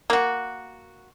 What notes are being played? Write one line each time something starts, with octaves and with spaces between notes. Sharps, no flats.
A#3 F#4